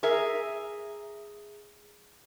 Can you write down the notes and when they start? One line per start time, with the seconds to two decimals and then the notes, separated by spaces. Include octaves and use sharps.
0.03 G#4 A#4 E5